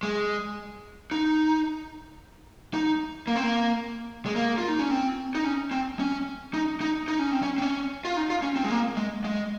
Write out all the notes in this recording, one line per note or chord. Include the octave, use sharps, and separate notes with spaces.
G#3
D#4
D#4
A#3
C4
A#3
G#3
A#3
F4
D#4
C#4
C4
D#4
C#4
C4
C#4
D#4
D#4
D#4
C#4
C4
C#4
C4
C#4
F4
D#4
F4
C#4
C4
G#3
A#3
G#3
G#3